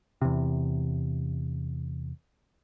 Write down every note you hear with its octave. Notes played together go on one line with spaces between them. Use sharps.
E2 C3